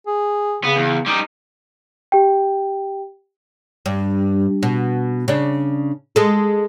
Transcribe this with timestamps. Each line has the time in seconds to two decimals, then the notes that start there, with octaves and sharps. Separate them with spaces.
0.07 G#4
0.64 C#3 B3
0.76 E2
1.06 G3 D#4
2.12 G4 G5
3.86 G2
4.63 B2
5.28 C#3 D4
6.16 G#3 A4